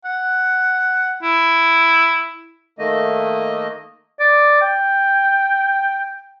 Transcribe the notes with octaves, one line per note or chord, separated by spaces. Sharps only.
F#5
E4
D#3 A3 A#3 D#5
D5
G5